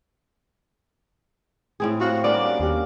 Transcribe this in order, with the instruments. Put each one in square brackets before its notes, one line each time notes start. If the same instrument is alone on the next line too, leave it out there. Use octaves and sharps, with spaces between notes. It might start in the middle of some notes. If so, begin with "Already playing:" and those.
[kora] A2 C4 G#4
[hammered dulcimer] C3 F5 F#5 [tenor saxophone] F#4
[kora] G3 B3 [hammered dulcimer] A#3 C#4 D4 [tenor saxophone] D5 [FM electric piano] D6
[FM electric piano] D#2 G4